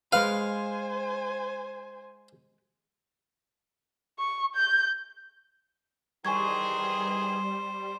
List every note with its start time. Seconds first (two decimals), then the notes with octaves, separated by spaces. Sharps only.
0.13 G#3 B4 C5 F5 G#5
4.19 C#6
4.55 G6
6.25 D#3 E3 G3 G#4 C5 G#5 C#6 G#6